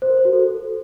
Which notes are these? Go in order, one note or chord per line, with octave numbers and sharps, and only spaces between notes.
C5
A#4
C5
F#4
A4